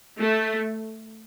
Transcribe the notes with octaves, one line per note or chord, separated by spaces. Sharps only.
A3